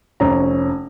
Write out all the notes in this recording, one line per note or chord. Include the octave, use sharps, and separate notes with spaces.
F1 C#4 A#5